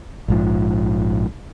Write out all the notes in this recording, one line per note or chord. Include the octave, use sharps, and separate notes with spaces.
A#1 G#2 F3